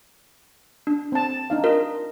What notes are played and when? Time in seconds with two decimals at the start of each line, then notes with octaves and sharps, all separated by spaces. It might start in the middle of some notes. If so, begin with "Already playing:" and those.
0.87 D4
1.12 C4 A5
1.50 D4 D#4 F5
1.64 F4 A#4 D#5